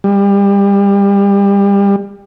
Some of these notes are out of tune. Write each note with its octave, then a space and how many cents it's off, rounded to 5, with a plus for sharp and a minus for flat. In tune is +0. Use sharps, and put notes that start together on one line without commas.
G3 +30